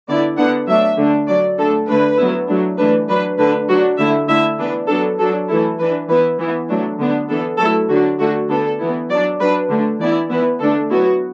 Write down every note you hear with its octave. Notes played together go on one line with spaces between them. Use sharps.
D3 B3 E4 D5
D3 B3 D4 F#5
F#3 A3 D4 E5
D3 A3 D4
F#3 D4 D5
D3 A3 D4 A4
D3 A3 D4 B4
F#3 B3 E4
F#3 A3 D4
E3 A3 D4 B4
F#3 D4 B4
D3 A3 D4 B4
F#3 D4 F#4
D3 A3 E4 E5
D3 A3 E4 E5
E3 B3 D4 B4
F#3 B3 D4 A4
F#3 D4 A4
E3 A3 E4 A4
E3 D4 B4
E3 B3 E4 B4
E3 B3 E4
F#3 A3 D4
D3 B3 D4
E3 B3 D4 A4
F#3 A3 E4 A4
D3 F#3 D4 F#4
D3 A3 D4 F#4
D3 B3 D4 A4
E3 B3 E4
F#3 D4 D5
F#3 D4 B4
D3 A3 D4
E3 B3 E4 D5
E3 B3 E4 B4
D3 A3 D4 A4
F#3 B3 E4 F#4